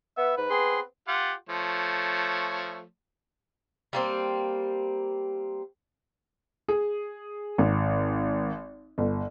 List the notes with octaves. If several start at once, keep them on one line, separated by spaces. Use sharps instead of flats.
B3 E5
G#2 B4
B3 C4 G#4 C6
F4 G4 F#5
F3 A3 C#5
G3 A#3 C4
G#4
G#1
G1